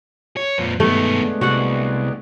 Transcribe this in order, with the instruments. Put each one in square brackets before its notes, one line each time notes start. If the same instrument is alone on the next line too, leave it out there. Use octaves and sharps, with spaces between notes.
[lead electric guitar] C#5
[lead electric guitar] F2 A#2 [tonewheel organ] B4 C5
[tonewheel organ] G2 B2 G#3 [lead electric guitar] D#3 B3 [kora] A3
[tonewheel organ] G#3 B3 D4
[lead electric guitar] C2 [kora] F#4 F#5